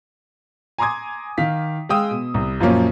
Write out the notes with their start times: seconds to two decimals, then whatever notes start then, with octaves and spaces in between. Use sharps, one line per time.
0.78 G#5 A#5 C6 D6 D#6 G#6
1.38 D#3 F5 B6
1.89 G#3 F5 G5 D#6 E6
2.11 B2
2.34 C2
2.60 F#2 A#2 F3 F#3 A#3 C#4